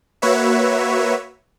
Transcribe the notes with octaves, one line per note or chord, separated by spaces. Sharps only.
A#3 F#4 B4 C#5 E5